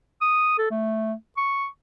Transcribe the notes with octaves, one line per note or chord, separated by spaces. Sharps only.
D#6
A4
A3
C#6